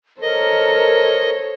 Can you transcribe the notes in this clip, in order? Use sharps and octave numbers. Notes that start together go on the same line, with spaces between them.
A4 A#4 C5 C#5 D#5